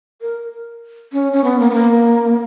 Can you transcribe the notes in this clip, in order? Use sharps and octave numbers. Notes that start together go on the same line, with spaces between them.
A#4
C#4
C#4
B3
A#3
B3
A#3